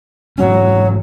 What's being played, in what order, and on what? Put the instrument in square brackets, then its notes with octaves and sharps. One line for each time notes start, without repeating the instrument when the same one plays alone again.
[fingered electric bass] G#2 E3 C#4 [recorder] F#3